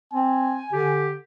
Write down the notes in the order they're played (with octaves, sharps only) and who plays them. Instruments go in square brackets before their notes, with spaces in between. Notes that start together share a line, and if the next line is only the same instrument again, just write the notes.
[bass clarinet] C4 [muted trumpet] G#5
[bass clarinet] D3 [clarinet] G4